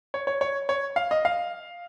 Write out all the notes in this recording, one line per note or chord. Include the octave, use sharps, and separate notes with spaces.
C#5
C#5
C#5
C#5
F5
D#5
F5